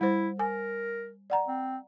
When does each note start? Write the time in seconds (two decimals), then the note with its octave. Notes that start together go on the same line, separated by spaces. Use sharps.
0.01 G3 E4 C5
0.39 A#4 G#5
1.30 D5 F#5 A#5
1.47 C4